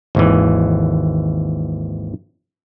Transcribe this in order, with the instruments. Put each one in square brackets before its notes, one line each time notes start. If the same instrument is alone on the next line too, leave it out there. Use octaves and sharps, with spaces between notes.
[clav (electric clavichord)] G#1 D#2 E3